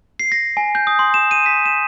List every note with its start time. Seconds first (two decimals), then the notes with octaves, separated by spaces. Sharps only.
0.19 C7
0.32 A#6
0.57 G#5
0.75 G6
0.87 D#6
0.99 C6
1.14 E7
1.31 D#7
1.46 B6
1.66 E7